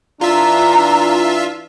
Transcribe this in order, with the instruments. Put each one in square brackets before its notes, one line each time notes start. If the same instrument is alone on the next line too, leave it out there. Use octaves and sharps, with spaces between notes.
[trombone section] E3 D4 [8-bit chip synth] F4 E5 [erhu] A#5